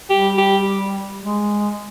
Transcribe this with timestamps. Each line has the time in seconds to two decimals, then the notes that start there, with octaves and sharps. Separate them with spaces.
0.10 G3 G4
0.38 G4
1.21 G#3